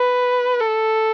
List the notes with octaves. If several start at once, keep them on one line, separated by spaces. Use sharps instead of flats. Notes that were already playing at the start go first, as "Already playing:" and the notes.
Already playing: B4
A4